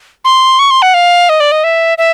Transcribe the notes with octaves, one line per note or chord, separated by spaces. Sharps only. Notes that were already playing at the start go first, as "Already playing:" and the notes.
C6
C#6
C6
F#5
F5
D#5
D5
D#5
E5
E5